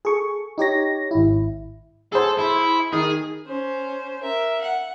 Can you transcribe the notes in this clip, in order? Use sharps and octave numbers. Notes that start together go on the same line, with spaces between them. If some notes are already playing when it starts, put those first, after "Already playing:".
G#4 A4 C#6
D#4 G4 C#5 A#6
G#1 E4
G#4 A4 C5
E4
D#3 G#4
C#4 C5
A#4 E5
F#5